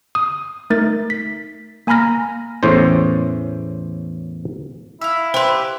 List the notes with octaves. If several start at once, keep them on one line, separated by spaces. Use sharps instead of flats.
D#6
A3 D#4 A#4 A6
B6
A#3 G#5 A#5 B5 F6 A#6
E2 A2 C#4 C5
E4 E5 F5
G4 B4 C5 C6